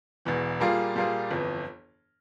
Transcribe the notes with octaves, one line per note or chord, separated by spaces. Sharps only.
E1 E2 E3
A#2 G3 A#3 F4 G#4
A#2 G3 A#3 F4 G#4
G1 F2 E3